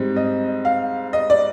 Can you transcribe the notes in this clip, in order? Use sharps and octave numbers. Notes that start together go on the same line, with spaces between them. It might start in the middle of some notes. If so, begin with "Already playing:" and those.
Already playing: G#2 G3 C4
D#5
F5
D#5
D5